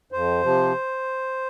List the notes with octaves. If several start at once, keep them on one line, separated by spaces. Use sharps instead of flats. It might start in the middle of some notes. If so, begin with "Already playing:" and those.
F2 C5
C3 F3